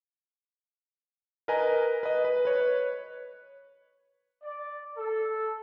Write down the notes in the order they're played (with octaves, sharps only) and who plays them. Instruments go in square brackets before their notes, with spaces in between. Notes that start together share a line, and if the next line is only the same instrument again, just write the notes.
[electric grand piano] A#4 B4 D#5 G#5 A#5
B4 D#5
B4
B4 C#5
[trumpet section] D5
A4